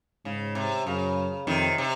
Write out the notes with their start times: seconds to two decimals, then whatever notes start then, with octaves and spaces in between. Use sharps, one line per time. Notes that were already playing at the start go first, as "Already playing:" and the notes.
0.25 G#2 C#3
0.55 C3
0.86 F#2 C#3
1.47 F2 C3 D#3
1.78 C3